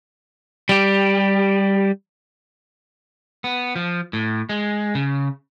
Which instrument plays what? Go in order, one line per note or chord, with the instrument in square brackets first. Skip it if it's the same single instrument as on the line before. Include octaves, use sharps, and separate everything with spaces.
[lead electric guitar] G3 G4
[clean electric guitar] B3
F3
A2
G#3
C#3